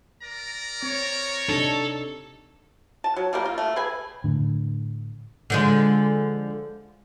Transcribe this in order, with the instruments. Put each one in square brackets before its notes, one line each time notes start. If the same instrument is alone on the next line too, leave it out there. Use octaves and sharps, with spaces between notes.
[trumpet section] A#4 D5 A#5
[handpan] C4 [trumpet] C#5
[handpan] C3 D4 D#4 [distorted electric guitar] A4
[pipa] A5
F#3
F3 G3 A3 A#3
F4
A3
G#4 B4 G#5
[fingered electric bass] A2 D3
[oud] D3 F3 G#3